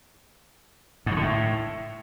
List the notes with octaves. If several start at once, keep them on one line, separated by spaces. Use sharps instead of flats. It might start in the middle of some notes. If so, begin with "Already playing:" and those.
G#2
D#3
D3
A2